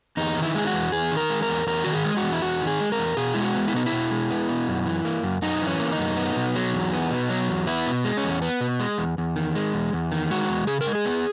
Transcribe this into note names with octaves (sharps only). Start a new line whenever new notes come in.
E2 D#4
D#3
E4
G#3 G#4
F#4
E2
E2 G#4
D#3
A#4
G#3
A#4
E2
E2 A#4
D#3 F#4
G#4
G#3
F#4
E2
E4
E2 F#4
D#3
G#4
G#3
A#4
E2
B2 G#4
G#3 E4
F#4
B3
E4
B2 D#4
E4
B2
G#3
B3
B2
F#2
E3
A#3
F#2
F#2 D#4
E3
C#4
A#3
D#4
F#2
B3
B2
F#3
E2
B3
B2
F#3
E2
B3 E4
B2
G#3
C#4
E2
B3
B2
G#3
E2
E2
D#3
G#3
E2
E2
D#3
G#3 F#4
E2
C#3 G#4
A#4
G#3
G#4
B3